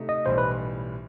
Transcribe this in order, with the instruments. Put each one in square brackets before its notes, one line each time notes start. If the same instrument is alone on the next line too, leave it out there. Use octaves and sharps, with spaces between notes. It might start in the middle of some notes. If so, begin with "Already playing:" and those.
Already playing: [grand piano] C3 A3 D#4
[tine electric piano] D#5
[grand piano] B1 A2 E3 G3 [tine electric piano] C5
[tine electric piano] B4